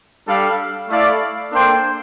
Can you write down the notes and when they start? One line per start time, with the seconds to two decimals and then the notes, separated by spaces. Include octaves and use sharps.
0.27 G3 D4 A4 D5 F5
0.88 A3 E4 A4 D5 F5
1.50 A#3 D4 A4 C5 G5